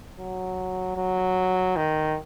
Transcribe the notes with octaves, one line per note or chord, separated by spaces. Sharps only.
F#3
F#3
D#3